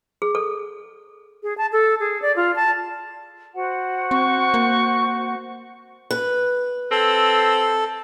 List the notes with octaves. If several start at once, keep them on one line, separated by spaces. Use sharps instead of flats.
G#4
A4
G#4
A5
A4
G#4
D5
F4
A5
F#4 C5 F#5
C4 C#6
A#3
B4
C4 A4